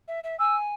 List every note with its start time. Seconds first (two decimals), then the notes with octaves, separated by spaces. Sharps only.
0.08 E5
0.24 E5
0.39 G#5 E6